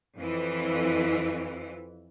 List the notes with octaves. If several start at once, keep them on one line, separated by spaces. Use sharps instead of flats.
F2 E3